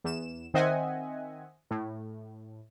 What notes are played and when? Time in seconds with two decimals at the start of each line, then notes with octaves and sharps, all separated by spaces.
0.04 E2 E7
0.54 D#3 C4 D#5 E5 F#5 G#5
1.71 A2